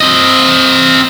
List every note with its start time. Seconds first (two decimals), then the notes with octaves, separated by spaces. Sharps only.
0.01 C4 D#5